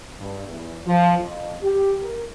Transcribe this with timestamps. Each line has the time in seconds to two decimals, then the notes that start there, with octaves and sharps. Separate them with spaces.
0.18 G2
0.47 E2
0.85 F3
1.18 F2
1.62 G4
2.03 A#4